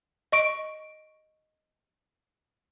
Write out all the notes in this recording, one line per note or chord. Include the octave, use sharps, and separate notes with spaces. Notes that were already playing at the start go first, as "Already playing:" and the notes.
D#5 C#6 D7